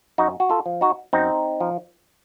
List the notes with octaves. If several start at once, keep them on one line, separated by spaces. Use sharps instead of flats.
F#2 D#4 F#4
F#4
F4 A4
F3
D#4 F#4
F#2 C4 D#4
F3